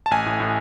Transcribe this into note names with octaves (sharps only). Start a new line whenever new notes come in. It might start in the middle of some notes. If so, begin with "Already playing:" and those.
A5
A1 G#5
A2
A2